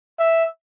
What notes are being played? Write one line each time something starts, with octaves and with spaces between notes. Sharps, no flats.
E5